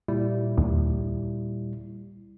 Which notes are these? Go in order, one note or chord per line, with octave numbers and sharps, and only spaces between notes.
A#2 G3 E4
D#2